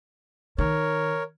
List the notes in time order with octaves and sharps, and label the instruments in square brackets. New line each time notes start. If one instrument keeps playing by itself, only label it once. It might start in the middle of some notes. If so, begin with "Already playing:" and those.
[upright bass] D#3 [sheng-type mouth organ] A#4 C#5